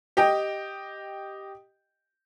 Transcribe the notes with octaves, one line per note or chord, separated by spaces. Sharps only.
G4 D#5 G5